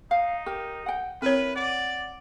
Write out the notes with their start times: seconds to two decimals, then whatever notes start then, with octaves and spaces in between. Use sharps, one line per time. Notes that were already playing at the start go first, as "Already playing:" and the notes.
0.11 D#4 F5
0.46 G4 A#4
0.86 F#5 G5
1.22 C4 E4 A#4 B4 C#5
1.56 D5 F#5